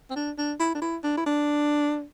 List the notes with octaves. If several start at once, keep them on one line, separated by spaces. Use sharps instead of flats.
C4
D4
D4
E4
D4
E4
D4
E4
D4